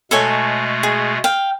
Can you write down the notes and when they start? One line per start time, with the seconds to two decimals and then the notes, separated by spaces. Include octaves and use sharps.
0.11 B2 G#3 A3 A4 C#5 G#5
0.83 G#4
1.24 F5 G5